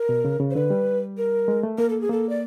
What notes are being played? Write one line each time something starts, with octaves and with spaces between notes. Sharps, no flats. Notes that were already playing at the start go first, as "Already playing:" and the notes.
Already playing: A#4
B2
C#3
C#3
C5
D3 B4
G3
A#4
G#3
A3
A#3 A#4
A4
G#4
A#3 A4
D5